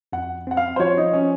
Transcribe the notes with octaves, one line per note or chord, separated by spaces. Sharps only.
F2 F#5
C4 F#5
F5
C5
F3 C#5
D#4
C#4